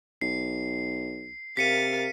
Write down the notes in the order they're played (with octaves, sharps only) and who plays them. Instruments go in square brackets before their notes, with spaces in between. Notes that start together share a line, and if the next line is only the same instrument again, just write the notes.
[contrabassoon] B1 [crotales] C7
[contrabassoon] C3 [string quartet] A#4 F5 A6 [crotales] B6 C#7 D#7